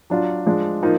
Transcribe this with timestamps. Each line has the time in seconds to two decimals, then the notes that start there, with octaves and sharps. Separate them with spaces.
0.10 F#3 D4 F4
0.46 F3 G#3 D4
0.83 F3 A#3 D#4